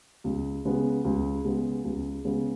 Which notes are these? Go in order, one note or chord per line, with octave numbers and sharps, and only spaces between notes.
C#2
C#3 G#3 B3
C#2
C#3 G#3 B3
C#2
C#3 G#3 B3